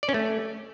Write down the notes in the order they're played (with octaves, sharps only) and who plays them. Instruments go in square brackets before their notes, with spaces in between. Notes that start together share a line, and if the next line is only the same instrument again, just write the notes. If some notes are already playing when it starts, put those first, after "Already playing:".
[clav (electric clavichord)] D5
C#4
A3